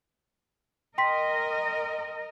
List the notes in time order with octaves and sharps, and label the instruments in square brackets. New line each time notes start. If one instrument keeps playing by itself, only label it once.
[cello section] A#4 D#5 [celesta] G5 C6 B6